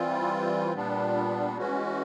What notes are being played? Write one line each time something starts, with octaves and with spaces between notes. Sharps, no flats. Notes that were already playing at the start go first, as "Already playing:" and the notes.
Already playing: E3 G3 C4 F4
A#2 G3 B3 D4
E3 G#3 C#4 F#4